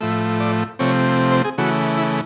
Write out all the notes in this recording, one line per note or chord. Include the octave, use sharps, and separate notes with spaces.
A2 F3 A3 E5
D5
C3 F3 A3 C4 C#5
C5
G#4
C#3 E3 A3 F#4
E4